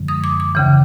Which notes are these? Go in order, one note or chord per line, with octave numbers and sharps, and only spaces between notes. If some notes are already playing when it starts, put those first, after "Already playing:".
Already playing: F#2 D3 F3 G#3
D#6
D6
D6
D#2 C#3 E3